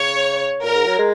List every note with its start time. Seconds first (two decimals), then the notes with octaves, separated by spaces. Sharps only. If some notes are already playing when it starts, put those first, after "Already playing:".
Already playing: C#3 C#5
0.63 A#2 A#4
0.75 G#2
0.86 F#3
0.99 G#3